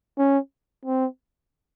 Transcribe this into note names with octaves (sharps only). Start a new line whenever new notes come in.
C#4
C4